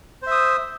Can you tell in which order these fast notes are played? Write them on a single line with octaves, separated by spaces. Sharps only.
C5 E5 D#6